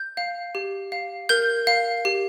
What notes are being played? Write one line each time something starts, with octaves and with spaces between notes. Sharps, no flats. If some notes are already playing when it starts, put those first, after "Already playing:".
Already playing: G6
F5
G4
F5
A#4 G6
F5
G4